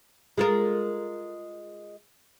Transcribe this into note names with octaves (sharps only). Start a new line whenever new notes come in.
G#3 F4 A#4